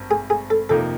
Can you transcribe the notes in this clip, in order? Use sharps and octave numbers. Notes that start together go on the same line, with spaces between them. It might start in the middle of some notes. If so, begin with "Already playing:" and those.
Already playing: G#1 G2
G#4
G#4
A4
F2 C3 F3 A#3 D#4 A4